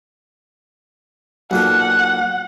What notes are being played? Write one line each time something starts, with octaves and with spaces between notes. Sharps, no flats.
B1 A#2 A4 F#5